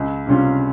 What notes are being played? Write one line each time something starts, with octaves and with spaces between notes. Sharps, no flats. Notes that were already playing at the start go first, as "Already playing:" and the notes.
Already playing: C#2
C3 G3 C#4 F4